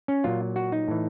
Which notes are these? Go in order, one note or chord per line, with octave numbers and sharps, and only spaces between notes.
C#4
A#2 F#3 F4
F#4
D#4
A2 E3